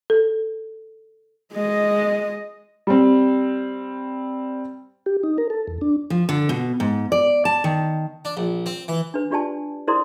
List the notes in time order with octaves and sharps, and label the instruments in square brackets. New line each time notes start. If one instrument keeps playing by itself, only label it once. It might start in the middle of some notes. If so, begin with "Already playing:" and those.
[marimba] A4
[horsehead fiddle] G#3 D#5
[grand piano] G3 C4
[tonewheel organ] G4
D#4
A#4
A4
E2
D4
[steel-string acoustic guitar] F3
D3
B2
G#2
D5
A5
D#3
[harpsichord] D4
A#1
C4
E3
[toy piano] D4 B4
D4 F4 G4 D5 G#5 A5
E4 A#4 C5 D5 C6 D#6